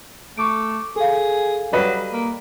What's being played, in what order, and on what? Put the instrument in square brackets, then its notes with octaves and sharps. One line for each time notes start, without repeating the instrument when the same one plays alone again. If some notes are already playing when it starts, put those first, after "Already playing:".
[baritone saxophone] A3 [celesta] C#6 D6 D7
[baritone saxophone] G#4 [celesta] A4 F5
[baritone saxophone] F#3 [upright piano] G3 B4 D#5
[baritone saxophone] A#3